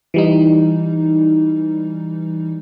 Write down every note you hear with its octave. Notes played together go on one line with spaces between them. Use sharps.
E3 G3 D#4